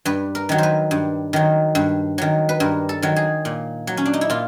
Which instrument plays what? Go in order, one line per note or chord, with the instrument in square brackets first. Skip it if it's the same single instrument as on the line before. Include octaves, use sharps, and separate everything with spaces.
[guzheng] G2 B4
A#4
D#3 F#3
B4 C5
G2
D#3 F#3
G2
D#3 F#3
B4
G2 A#4
A4
D#3 F#3
G#4
A#2
F#3
C#4
D4
D#4
E4
A#2 F4